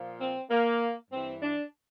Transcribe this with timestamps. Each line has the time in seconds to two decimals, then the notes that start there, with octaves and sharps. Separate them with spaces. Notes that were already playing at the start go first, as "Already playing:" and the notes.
Already playing: A#2 F3
0.21 C4
0.51 A#3
1.11 G2 E3 C4
1.42 D4